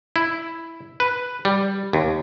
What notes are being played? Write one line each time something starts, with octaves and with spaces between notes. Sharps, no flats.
E4
B4
G3
D#2